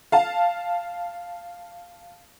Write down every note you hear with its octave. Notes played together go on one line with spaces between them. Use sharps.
F5 A5